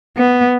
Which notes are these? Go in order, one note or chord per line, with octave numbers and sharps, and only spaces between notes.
B3